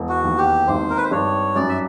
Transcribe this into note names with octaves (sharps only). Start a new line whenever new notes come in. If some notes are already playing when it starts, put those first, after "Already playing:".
Already playing: E1
F#4
D#2
G4
G#1 C5
A#4
B4
C5
G2 C#5
F#2 D5
E5